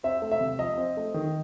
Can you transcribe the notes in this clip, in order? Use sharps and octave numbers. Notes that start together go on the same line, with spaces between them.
C4 E5
A3
E5
C3
F3 D#5
C4
A3
D#3